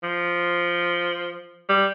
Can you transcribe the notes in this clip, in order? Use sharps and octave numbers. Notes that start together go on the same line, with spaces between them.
F3
G3